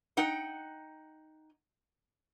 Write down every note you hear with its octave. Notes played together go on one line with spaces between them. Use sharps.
D#4 F#5 G5